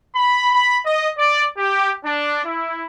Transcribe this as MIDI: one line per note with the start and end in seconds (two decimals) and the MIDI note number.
0.14 0.51 83
0.52 0.76 83
0.85 1.07 75
1.16 1.43 74
1.57 1.90 67
2.03 2.44 62
2.44 2.83 64